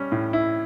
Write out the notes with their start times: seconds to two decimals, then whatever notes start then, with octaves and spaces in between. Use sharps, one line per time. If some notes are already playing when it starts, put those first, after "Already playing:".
Already playing: G3 C#4
0.12 A2
0.33 E4